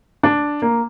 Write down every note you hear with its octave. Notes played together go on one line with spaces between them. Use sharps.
D4
A#3